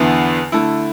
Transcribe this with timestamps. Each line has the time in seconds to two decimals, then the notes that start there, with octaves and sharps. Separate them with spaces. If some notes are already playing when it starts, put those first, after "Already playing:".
Already playing: E2 D3 B3 E4
0.52 D3 A3 E4